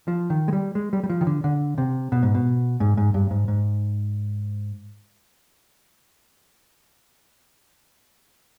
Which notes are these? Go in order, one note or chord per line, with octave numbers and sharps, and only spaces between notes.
F3
D#3
G#3
G3
G#3
G3
G3
F3
D#3
D3
D3
C3
B2
G#2
B2
G#2
G#2
G2
G#2
G#2